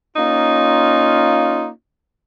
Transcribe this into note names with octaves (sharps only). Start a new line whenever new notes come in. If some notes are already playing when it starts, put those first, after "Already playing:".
A#3 C#4 D#4 F4